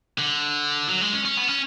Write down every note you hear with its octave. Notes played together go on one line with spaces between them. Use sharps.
D3
F#3
G#3
C#4
C#4
B3
C#4